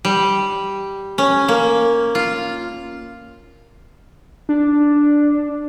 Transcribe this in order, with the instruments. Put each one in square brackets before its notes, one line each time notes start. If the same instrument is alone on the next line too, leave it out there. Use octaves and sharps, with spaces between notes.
[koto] G3
C#4
A#3
F4
[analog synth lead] D4